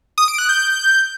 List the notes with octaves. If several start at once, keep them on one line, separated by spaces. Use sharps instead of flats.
D#6
D7
F#6
G6